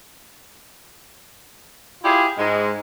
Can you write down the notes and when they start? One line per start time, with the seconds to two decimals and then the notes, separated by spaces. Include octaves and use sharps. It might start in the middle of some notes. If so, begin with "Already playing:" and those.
2.04 E4 F4 G4 G#4
2.39 G#2 G#3